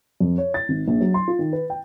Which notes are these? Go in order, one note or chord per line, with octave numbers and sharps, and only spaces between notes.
F2
C#5
A6
G#1
A#1
F#3
C6
F4
D#3
B4
G5